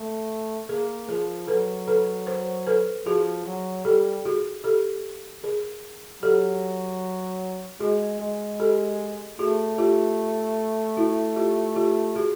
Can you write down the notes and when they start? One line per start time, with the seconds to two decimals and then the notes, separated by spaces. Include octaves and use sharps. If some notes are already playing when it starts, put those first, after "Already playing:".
Already playing: A3
0.68 A#3 G#4 A#4
1.09 F3 G#4 A#4
1.48 F#3 A4 B4
1.88 A4 B4
2.27 A#4 C5
2.67 A4 B4
3.06 F3 F#4 G#4
3.46 F#3
3.85 G3 G4 A4
4.25 F#4 G#4
4.64 G4 A4
5.44 G#4 A#4
6.23 F#3 G4 A4
7.80 G#3 F#4 G#4
8.20 G#3
8.60 G4 A4
9.38 A3 F#4 G#4
9.78 F4 G4
10.97 E4 F#4
11.36 F4 G4
11.76 F4 G4
12.15 F#4 G#4